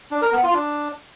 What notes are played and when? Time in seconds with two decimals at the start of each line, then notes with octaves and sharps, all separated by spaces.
0.11 D4
0.22 A#4
0.32 B3
0.43 F4
0.54 D4